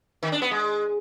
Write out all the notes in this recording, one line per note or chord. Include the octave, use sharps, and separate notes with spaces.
D#3
D4
B3
G#3